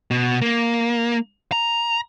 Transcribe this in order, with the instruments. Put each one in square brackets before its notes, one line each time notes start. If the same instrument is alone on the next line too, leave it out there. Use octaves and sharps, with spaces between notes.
[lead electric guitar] B2
A#3
A#5